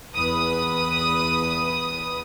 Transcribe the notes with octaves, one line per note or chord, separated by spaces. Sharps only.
E2 B4 D#6